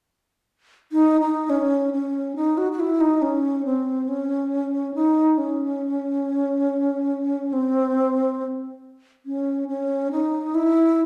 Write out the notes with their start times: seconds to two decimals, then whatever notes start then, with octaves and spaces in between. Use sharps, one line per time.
0.92 D#4
1.21 D#4
1.50 C#4
1.93 C#4
2.36 D#4
2.58 F#4
2.72 F#4
2.80 E4
3.01 D#4
3.22 C#4
3.65 C4
4.08 C#4
4.95 D#4
5.38 C#4
7.53 C4
9.26 C#4
9.69 C#4
10.11 D#4
10.55 E4